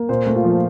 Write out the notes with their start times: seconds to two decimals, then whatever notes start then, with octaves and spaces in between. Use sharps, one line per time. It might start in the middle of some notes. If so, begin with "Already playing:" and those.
Already playing: A#3
0.09 A#2 C5
0.26 A3
0.36 F4
0.45 F3